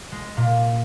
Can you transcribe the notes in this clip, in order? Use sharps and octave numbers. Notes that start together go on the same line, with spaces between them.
G#3
A#2